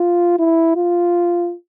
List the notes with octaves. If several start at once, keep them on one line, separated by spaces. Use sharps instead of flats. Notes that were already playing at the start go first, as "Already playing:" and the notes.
Already playing: F4
E4
F4